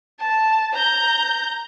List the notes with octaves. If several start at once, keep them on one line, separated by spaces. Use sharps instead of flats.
A5
A#5 G6